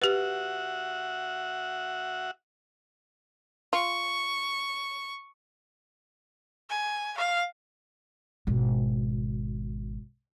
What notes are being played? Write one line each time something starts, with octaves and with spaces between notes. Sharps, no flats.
F#4 G4 B4 E5 F#5
F4 C#6
G#5
F5
G#1 B2